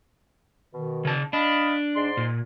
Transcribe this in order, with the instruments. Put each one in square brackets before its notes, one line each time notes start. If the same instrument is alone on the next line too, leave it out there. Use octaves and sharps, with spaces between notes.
[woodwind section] B2 D#3
[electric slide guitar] C#3 A5
[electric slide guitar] D4 [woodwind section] D#5 F5 B5
[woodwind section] G#2 D5 C6
[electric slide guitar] A#2